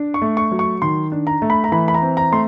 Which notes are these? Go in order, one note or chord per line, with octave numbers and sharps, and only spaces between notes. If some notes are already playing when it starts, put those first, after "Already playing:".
Already playing: D4
C#6
A3
C#6
F#3
C#6
D#3 C6
D4
A#5
A3
B5
A#5
E3 B5
B5
A#5
C4
A#5
A3 C6